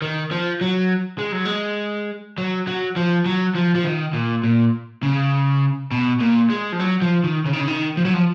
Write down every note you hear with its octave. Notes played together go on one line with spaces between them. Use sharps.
D#3
F3
F#3
G#3
F#3
G#3
F#3
F#3
F3
F#3
F3
F3
D#3
A#2
A#2
C#3
B2
A#2
G#3
F3
F#3
F3
D#3
C#3
D#3
C#3
D#3
F3
F#3
F3